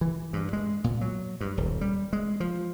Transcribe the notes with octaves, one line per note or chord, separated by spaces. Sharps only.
E3
G2
G#3
A#2
F#3
G2
D#1
G3
G#3
F3